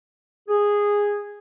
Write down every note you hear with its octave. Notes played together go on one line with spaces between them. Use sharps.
G#4